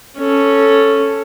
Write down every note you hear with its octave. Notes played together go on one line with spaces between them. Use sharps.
C#4 A4